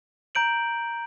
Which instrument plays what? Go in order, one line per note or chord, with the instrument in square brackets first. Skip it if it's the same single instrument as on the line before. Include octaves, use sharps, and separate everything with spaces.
[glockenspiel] A#5 G6 D7 F#7